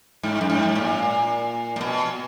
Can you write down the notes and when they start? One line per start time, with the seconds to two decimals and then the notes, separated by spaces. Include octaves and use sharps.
0.23 G#2
0.41 F#2
0.50 G#2
0.75 A#2
1.76 A#2
1.81 B2